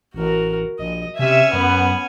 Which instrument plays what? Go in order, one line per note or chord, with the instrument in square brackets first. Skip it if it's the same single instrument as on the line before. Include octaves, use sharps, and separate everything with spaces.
[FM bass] A1 [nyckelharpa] F#4 A#4
[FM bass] A#1 [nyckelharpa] D#5
[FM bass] C3 [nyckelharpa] C#4 G#5 [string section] E5
[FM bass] F#2 [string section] B3